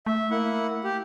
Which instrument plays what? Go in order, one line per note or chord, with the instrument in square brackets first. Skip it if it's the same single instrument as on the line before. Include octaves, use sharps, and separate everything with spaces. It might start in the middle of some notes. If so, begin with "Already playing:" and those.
[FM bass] A3 [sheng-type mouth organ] E5
[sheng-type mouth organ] A#3 E4 F#5
G4